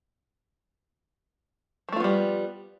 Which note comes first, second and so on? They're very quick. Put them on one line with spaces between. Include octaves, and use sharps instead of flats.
F3 A3 F4 B3 G3